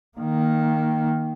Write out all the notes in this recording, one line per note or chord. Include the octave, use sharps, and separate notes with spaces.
D#3 A#3